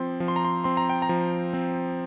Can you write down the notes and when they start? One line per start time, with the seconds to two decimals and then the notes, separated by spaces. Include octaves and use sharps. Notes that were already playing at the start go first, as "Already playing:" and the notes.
Already playing: F3 C4 C6
0.20 F3
0.28 C6
0.36 A#5
0.45 C6
0.64 C4 C6
0.77 A#5
0.89 G5
1.02 A#5
1.09 F3
1.54 C4